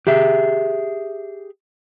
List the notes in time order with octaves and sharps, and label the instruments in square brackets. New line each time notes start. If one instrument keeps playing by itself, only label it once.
[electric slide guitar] G4 G#4 E5